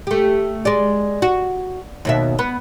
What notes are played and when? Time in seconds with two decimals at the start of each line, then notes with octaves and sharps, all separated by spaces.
0.07 A3 G4
0.65 G#3 D5
1.22 F#4
2.05 D#2 B2 E5
2.39 B3